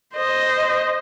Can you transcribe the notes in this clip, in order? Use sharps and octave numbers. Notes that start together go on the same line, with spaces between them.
C5 D#5